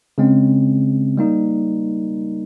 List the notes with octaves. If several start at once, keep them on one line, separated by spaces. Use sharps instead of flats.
C#3 G#3 C4
G3 A#3 D#4